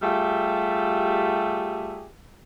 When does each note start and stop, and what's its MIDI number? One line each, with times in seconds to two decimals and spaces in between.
0.02 2.06 55
0.02 2.06 57
0.02 2.06 65
0.02 2.06 67
0.02 2.06 68
0.02 2.06 76